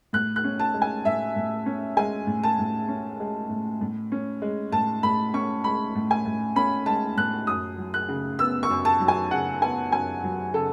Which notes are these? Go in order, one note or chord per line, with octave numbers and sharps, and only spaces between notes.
A2 F#6
F#6
C#4
A5
G#3
G#5
A2 E5
A2
C#4
G#3 G#5
A2
A5
A2
C#4
G#3
A2
A2
C#4
G#3
A2 A5
A2 B5
C#4 C#6
G#3 B5
A2
G#5
A2
C#4 B5
G#3 A5
A2 F#6
F#2 D#6
F#3
F#6
C#3
B3 E6
C#6
F#2
A5
F#3
G#5
C#3 F#5
B3 G#5
F#2 G#5
F#3
C#3 A4